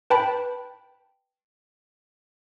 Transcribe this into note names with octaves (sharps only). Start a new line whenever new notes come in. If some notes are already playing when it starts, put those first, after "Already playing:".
B4 G5 A5 B5